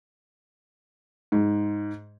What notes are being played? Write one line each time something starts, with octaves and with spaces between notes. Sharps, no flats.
G#2